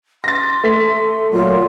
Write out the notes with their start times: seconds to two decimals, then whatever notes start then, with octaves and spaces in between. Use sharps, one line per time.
0.24 C6 A6 A#6
0.64 A3 B6
1.32 A#2 F#3 F4 A#4